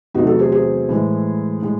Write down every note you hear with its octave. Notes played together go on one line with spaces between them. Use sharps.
E2 C3 F#3 A3 D#4 F#4
F#4 A4
G#4 C5
G#4 C5
A2 E3 G#3
A2 G#3